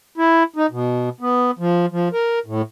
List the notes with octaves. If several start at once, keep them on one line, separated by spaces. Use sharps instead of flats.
E4
D#4
B2
B3
F3
F3
A#4
A2